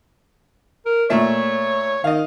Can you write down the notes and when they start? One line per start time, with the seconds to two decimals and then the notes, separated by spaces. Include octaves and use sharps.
0.86 A#4
1.10 A#2 A3 C#5 E5
2.04 D#3 D#5 F5